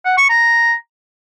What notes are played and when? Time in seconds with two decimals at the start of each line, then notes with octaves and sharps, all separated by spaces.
0.05 F#5
0.17 C#6
0.29 A#5